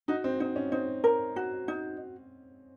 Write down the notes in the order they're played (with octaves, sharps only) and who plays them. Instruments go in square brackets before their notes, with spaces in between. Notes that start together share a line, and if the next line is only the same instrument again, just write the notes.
[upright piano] D#4 [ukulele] F#4
[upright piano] C4
[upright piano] C4 [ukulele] D#4
[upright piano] C#4
[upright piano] C4 [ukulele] D#4
[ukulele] A#4
F#4
D#4